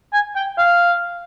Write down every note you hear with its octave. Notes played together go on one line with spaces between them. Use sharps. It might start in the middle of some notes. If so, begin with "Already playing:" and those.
G#5
G5
F5